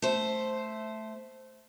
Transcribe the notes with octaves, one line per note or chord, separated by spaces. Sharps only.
A3 C5